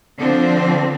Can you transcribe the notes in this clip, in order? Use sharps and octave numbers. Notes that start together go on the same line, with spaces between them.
D3 F3 C4 D4